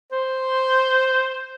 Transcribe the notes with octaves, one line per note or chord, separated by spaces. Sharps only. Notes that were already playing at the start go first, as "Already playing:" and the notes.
C5